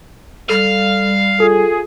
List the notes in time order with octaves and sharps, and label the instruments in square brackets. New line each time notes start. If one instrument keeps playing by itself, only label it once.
[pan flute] G3 [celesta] A4 [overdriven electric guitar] F5
[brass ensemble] F4 G#4 [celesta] A4